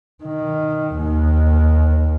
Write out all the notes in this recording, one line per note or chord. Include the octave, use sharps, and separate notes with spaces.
D#3
D#2